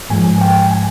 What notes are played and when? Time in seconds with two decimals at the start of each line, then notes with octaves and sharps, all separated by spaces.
0.10 G#2 F3 G#3 G#5
0.41 G5
0.71 G#5